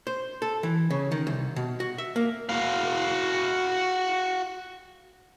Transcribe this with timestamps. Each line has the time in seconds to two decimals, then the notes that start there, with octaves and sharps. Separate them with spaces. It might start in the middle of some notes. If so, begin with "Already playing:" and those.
0.07 C5
0.42 A4
0.63 E3
0.91 C#3
1.12 D#3
1.27 C2
1.56 B2
1.80 F#4
1.98 E5
2.16 A#3
2.49 F#4 F5